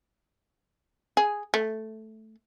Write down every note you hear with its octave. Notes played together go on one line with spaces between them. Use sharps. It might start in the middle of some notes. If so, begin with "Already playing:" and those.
G#4
A3